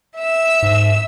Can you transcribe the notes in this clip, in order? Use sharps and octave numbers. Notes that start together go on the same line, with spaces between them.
E5 E6
G#2